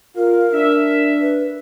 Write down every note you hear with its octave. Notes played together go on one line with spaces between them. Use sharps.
F4 A#4 F5
D4 E5
B4